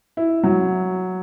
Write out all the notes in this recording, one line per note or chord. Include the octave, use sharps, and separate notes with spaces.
E4
F#3